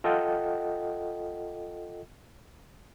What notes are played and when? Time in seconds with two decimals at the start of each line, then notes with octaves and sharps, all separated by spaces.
0.04 F4 A4 D#5 F#5 G5